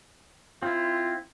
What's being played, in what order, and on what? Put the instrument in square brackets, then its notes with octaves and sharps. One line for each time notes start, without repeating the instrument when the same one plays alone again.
[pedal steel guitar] C4 E4 [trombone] F4